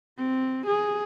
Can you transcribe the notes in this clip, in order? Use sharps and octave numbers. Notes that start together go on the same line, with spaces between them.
C4
G#4